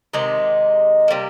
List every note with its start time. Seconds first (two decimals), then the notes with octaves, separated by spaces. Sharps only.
0.13 C3 D#3 G#3 D#4
1.08 C3 G3 A#3